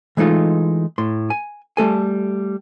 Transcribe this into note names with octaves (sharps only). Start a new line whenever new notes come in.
E3 G#3 A3 D#4 F4
A2 C6
G#5
G3 A3 A4 G#5